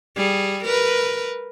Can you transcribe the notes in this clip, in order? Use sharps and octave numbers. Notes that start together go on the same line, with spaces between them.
G3 G#4
A#4 B4